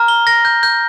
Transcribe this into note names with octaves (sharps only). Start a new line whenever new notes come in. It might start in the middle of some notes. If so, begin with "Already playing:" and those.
Already playing: A#5 F6
G7
A#6
G6
G6